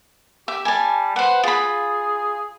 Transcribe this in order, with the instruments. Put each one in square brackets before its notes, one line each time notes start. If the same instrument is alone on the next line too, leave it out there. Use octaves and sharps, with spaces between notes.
[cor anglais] G4 [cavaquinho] E5
[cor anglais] G3 [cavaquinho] G#5 A5
[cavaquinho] B4 C5 [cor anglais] F#5
[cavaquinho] F4 B5 [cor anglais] G#4